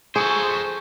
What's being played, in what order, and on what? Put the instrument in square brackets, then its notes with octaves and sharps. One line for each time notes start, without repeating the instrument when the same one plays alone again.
[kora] G#4 [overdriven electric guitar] A4 C5 [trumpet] C#6